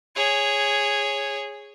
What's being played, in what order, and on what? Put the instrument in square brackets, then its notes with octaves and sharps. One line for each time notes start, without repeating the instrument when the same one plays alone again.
[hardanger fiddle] G#4 C#5